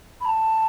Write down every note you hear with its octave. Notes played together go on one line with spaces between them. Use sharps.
B5
A5